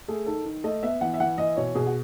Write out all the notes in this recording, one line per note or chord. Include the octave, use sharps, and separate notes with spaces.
A3 G#4
D#3 A4
D#3
A3 D#5
B3 E5
E3 F#5
E5
E3 F#5
E3 D#5
B2 C#5
B2 G#4
F#4